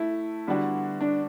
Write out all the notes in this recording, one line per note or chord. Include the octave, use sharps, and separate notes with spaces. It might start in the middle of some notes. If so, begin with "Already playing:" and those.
Already playing: A3 E4
D3 G3 B3 D4 F#4
D4